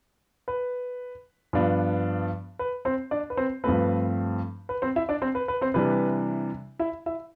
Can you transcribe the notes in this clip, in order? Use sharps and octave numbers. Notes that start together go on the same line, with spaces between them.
B4
G2 F3 B3 D4
B4
C4 C5
D4 D5
B4
C4 C5
G2 F3 A3 C4 B4
B4
C4 C5
E4 E5
D4 D5
C4 C5
B4
B4
C4 C5
C3 E3 G3 D4 B4
E4 E5
E4 E5